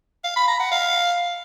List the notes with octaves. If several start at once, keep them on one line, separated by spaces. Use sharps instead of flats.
F5
B5
A#5
F#5
F5